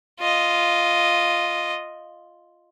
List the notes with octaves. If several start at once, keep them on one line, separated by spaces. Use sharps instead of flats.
F4 D#5